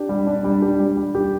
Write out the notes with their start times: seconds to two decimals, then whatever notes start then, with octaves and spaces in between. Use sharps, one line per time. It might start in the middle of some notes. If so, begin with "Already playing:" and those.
Already playing: D4 G4
0.09 G3
0.27 D4
0.44 G3
0.62 G4
0.80 G3
0.97 G3
1.15 G4